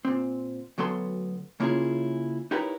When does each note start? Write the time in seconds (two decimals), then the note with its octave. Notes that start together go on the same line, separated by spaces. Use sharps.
0.05 A#2 C4
0.78 D2 F#3 B3 A4 C6
1.60 C#3 A#3 C#4 E4 F4 G#4
2.51 D#4 E4 G4 A#4 B4 C#5